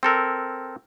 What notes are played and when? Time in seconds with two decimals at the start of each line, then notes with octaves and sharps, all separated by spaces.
0.03 C4 A4 A#4